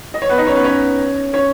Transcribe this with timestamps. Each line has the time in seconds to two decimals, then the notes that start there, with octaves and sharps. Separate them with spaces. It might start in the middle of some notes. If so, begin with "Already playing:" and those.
0.14 D#5
0.22 C#5
0.29 B3 B4
0.38 D#4 D#5
0.47 C#4 C#5
0.55 B3 B4
0.64 C#4 C#5
1.33 C#4 C#5